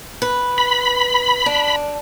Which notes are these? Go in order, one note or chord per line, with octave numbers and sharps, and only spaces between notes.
B4
B5
D4